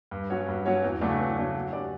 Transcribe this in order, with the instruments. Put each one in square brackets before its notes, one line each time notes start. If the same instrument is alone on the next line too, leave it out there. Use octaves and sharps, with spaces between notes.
[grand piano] G2
F#3 C#4 F#4 C#5
G2
F#3 C#4 F#4 C#5
E2
C#3 F#3 A3 D4
E2
C#3 F#3 A3 D4
F#3
C#4 G4 D5